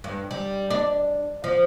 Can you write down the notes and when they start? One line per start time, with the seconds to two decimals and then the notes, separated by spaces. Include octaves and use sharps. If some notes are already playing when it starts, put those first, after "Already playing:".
0.04 G2
0.31 G3
0.70 D4
1.44 F3